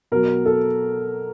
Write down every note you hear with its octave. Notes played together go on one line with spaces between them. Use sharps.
B2 F#3 A#4
A4